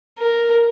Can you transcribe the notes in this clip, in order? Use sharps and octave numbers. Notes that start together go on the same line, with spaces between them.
A#4